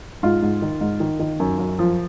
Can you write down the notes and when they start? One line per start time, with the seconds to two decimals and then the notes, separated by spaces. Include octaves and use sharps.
0.23 G#2 F4
0.42 G#2
0.62 D#3
0.81 G#2
1.00 D#3
1.20 D#3
1.40 F#2
1.59 F#2
1.79 F3